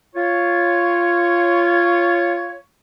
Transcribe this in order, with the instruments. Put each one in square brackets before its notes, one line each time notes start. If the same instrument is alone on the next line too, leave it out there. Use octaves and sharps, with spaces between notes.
[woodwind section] F4 C#5